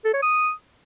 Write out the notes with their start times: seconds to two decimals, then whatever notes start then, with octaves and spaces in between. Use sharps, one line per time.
0.05 A4
0.14 C#5
0.23 D#6